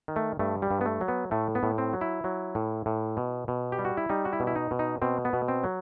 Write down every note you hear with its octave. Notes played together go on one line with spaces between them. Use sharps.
D#3
A3
G2 A3
G3
G2
B3
A3
F#3
B3
A2 A3
B3
A2
C4
F#3
E4
F#3
A2
A2
B2
B2
G4
G3
F#4
E4
G3 D#4
F#4
E4
B2
E4
D#4
B2
D#4
B2 C4
B3
B2
C4
F#3